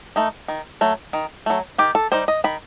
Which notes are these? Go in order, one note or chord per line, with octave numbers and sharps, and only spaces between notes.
A3 D#4
D#3
F#3 A3
D#3
F#3 A3
D#3 G4
A4
G3 D#4 C5
D#5
D#3 B5